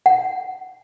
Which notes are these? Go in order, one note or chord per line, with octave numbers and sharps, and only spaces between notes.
F#5